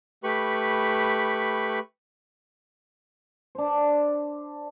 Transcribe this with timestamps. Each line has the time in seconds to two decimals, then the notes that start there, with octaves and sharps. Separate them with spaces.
0.24 A3 G4 B4 B5 C#6
3.55 D4 C5